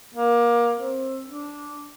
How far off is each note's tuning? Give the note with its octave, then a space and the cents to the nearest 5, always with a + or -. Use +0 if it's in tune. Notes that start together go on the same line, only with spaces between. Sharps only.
A#3 +25
C4 +20
D4 -10